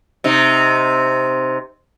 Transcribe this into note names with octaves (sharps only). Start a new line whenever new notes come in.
C3 D#4